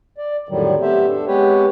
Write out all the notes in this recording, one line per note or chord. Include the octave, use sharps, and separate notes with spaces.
D5
F2 A2 D3 D#3 F#3 G3
A3 B3 C4 G4 C5 E5
D4 A4
G#3 B3 C4 G4 B4 C#5